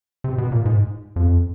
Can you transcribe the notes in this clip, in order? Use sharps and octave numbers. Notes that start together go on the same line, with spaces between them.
C3
B2
A#2
G#2
F2